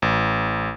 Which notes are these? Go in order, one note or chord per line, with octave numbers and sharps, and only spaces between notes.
A1